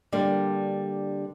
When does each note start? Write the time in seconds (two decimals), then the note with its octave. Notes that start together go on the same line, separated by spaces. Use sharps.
0.12 D3 G3 A#3 D4